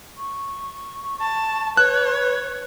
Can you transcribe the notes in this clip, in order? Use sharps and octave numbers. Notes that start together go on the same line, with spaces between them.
C#6
A5
B4 C#5 F#6